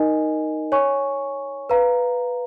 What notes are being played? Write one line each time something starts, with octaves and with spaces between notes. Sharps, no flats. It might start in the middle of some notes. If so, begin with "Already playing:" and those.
Already playing: D#4 A#4 D#5 G#5
C#5 G#5 C#6
B4 F5 A#5